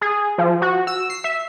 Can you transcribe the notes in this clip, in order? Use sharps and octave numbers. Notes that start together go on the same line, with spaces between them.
G#4
F3
F#4
E6
C7
E5